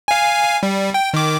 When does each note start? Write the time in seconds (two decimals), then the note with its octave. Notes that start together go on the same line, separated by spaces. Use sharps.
0.08 F5 G#5
0.63 G3
0.94 G5
1.14 D#3 D6